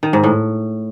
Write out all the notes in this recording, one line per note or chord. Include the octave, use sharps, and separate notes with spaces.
D#3
G#2
A2